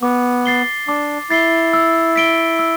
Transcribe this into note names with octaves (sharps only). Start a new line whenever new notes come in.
B3 D6
A6 C7 G7
D4 D6
E4 A6 C7 G7
E6
B6 D7 G7
E6